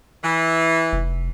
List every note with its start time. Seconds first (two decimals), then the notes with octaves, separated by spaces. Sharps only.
0.24 E3
0.93 F1